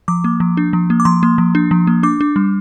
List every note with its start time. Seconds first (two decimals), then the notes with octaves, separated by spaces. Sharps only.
0.08 F3 D6
0.24 A#3
0.40 F3
0.57 D4
0.73 F3
0.90 A#3
1.00 D6
1.05 F3 C6
1.23 A#3
1.38 F3
1.55 D4
1.71 F3
1.87 A#3
2.03 D4 D6
2.21 D4
2.36 G3